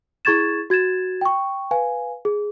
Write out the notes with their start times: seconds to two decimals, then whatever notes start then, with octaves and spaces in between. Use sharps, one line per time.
0.25 E4 G#4 C#6 G#6 A6 E7
0.70 F#4 G#6 A6 E7
1.21 G5 C#6
1.71 B4 F5 G#5
2.25 G#4